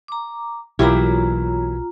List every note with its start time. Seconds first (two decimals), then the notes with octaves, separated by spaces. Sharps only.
0.08 A#5 D6
0.79 B1 E3 F#3 A#3 E4 F4 G4 A#5